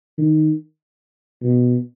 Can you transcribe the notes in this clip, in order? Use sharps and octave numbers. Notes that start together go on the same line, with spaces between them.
D#3
B2